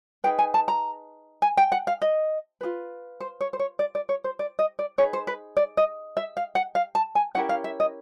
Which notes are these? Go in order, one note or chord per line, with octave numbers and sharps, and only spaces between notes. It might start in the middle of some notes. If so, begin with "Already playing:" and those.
D#4 G#4 B4 G5
G#5
A5
A#5
G#5
G5
F#5
F5
D#5
F4 G#4 B4
C5
C#5
C5
C#5
D5
D5
C#5
C5
D5
D#5
D5
D#4 G#4 B4 C#5
C5
B4
D5
D#5
E5
F5
F#5
F5
A5
G#5
C#4 E4 G4 A#4 F#5
F5
E5
D#5